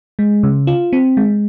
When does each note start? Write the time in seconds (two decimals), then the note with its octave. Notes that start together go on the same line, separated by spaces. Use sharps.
0.19 G#3
0.43 C#3
0.67 F4
0.93 C4
1.17 G#3